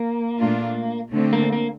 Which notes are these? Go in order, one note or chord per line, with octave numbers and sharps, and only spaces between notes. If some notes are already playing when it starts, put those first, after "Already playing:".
Already playing: A#3
A#2 A3 D4 F4
D3 A3 C4
A#3
A#3